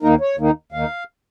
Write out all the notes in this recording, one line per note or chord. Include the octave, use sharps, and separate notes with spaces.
D#2 D#3 A#3 D#4 A#4
C#5
D#2 D#3 A#3 D#4
D#2 D#3 A#3 D#4 F5